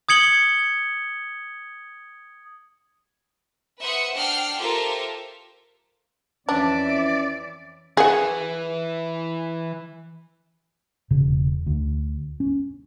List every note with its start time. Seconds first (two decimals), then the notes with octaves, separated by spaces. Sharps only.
0.09 D#6 G#6 C#7 F#7 G7
3.80 B4 C5 E5 F#5 D#6 C#7
4.13 D4 F#5 G5 F6 C7
4.59 F4 G4 A4 A#4 C5 E5
6.49 F2 E3 C#4 D4 D5 E5
7.97 E3 G#4 F#5
11.10 E1 C#3
11.66 D2
12.40 C#4